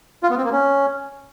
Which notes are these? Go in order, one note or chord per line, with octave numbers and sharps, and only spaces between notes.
F4
B3
C4
A#3
C#4